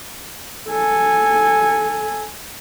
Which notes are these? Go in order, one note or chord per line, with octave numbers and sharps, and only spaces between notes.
A4 G#5